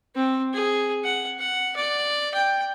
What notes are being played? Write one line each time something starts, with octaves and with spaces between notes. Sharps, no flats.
C4
G#4
F#5
F#5
D5
G5